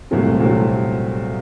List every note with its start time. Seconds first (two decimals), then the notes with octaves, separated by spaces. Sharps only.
0.11 C2 A#2 F#3 A3 C4
0.40 C2 A#2 F#3 A3 C4